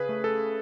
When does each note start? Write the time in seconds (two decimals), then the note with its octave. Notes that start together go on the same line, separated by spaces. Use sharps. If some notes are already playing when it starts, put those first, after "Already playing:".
Already playing: C#3 G#4 B4
0.09 A3
0.24 A4